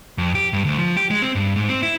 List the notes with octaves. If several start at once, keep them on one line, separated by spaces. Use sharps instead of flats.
F2
G4
G2
D2
F3
G4
G#3
C4
G2
G#2
C4
E4